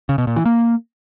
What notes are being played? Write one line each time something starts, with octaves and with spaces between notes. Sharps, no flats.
C#3
B2
A#2
E3
A#3